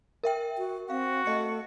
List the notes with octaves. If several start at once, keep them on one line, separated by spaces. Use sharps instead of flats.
A#4 E5 G5
F#4
C4 F#4 F5
A3 D#5 C#7